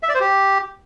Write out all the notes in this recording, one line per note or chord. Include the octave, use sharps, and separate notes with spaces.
E5
D5
C5
G4